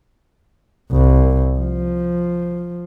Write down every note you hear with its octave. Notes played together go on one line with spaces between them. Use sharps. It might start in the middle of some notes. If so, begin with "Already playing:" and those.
C2
F3